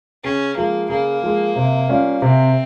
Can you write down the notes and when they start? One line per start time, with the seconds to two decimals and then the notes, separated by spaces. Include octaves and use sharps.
0.24 C#3 C#4
0.57 F3 G#3 A#3
0.89 C#3 A#3
1.23 F3 G#3
1.56 C3
1.89 G3 C#4 F4
2.22 C3 C4